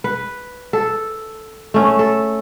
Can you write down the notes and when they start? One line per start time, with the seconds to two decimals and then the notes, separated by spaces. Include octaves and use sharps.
0.04 B4
0.73 A4
1.74 A3 C#4
1.99 A4